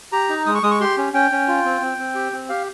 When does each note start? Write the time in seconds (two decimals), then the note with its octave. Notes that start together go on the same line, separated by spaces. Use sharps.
0.12 G4 A#5
0.29 D#4
0.46 G#3 D#6
0.55 C#6
0.63 G#3 D#6
0.71 C#6
0.80 G4 C6
0.97 C#4
1.13 C#4 G5
1.31 C#4
1.48 F4
1.65 C4
1.81 C4
1.98 C4
2.15 G4
2.33 C4
2.49 G4 F5